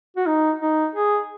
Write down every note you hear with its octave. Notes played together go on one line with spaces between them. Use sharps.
F#4
D#4
D#4
G#4